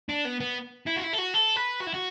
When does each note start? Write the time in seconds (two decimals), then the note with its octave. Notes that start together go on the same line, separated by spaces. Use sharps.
0.09 D4
0.25 B3
0.41 B3
0.86 E4
0.96 F#4
1.03 E4
1.13 A4
1.18 F#4
1.34 A4
1.56 B4
1.81 F#4
1.87 E4
1.94 F#4